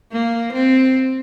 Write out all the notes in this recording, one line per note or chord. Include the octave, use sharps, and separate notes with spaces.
A#3
C4